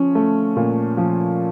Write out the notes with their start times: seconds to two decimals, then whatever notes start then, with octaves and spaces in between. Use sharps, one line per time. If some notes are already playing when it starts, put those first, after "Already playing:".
Already playing: F3 C#4
0.15 A3
0.56 A#2
0.97 F3